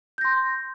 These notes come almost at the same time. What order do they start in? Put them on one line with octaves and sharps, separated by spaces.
G6 A#6 C6